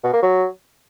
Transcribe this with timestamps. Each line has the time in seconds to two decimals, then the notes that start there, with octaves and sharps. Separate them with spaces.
0.04 B2
0.13 A#3
0.23 F#3